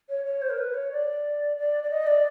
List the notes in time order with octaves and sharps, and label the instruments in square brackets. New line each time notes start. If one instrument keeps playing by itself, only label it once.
[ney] C#5
C#5
C5
A#4
B4
C#5
D5
D5
D5
D#5
D5